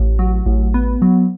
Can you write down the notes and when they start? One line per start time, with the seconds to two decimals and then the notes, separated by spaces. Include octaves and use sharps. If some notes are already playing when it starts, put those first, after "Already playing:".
Already playing: A1
0.19 F#3
0.46 A1
0.74 B3
1.02 F#3